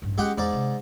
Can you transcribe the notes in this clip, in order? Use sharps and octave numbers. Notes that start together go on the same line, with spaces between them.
A1 G2
G#3 C#4 F4 G4 F#5
E2 G#2 D5
C3